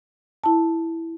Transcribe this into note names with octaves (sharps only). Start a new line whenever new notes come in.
E4 A5